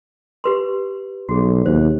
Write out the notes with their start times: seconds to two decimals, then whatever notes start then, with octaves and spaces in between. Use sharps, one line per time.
0.44 G4 B4 C6
1.29 B1 F#4 G#4
1.66 D#2 C5